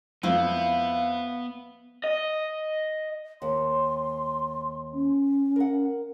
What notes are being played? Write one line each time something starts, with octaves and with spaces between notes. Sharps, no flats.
F2 B3 E4 C5 F5
D#5
D#2 C6
C#4
A#4 F#5